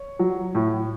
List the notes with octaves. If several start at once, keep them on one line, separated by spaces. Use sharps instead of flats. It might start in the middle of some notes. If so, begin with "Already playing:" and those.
Already playing: C#5
F#3
A2